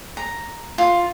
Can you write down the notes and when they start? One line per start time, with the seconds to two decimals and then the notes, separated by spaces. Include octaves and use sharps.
0.17 A#5
0.78 F4